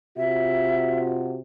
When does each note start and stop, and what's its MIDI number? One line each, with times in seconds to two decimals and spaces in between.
0.17 1.40 48
0.17 1.40 65
0.17 1.40 66
0.17 1.02 76